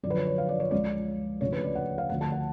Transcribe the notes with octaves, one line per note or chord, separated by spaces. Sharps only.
F#2 D3 F3 D5
B4
C#5
C#5
F5
D5
C#5
C#2 C#3 F3 D5
D2 C#3 F3 C#5
B4
D5
F#5
F5
D2 D3 F3 F#5
A5
F#5